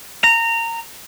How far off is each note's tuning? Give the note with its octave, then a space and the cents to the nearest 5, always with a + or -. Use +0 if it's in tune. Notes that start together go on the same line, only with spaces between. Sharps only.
A#5 -20